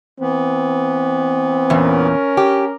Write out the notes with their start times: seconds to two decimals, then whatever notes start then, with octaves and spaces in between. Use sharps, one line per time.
0.20 E3 B3 C4
1.70 E2 A#2 C#4 A#4
2.37 G4